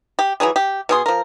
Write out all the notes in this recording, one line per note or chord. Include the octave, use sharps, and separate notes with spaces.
G4
E3 F#3 D#4 G#4
G4
B2 G#4 C6
F3 A#4